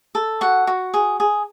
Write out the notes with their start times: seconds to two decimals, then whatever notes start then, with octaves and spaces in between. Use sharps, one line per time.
0.15 A4
0.41 F#4 F#5
0.67 F#4
0.94 G#4
1.20 G#4